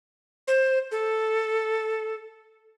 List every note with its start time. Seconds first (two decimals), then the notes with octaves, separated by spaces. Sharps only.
0.48 C5
0.92 A4